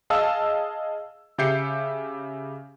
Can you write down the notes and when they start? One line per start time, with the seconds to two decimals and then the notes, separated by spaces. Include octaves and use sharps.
0.10 G#4 D#5 F5 A5 E6
1.38 C#3 G4 E5 G6 C7 C#7